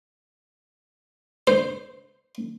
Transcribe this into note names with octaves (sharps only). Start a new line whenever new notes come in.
C5